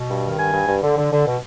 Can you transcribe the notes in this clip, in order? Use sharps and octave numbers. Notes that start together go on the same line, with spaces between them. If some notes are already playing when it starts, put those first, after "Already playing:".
Already playing: B2
G2
D#3
G2 G#5
G2
G2
D3
D3
D3
B2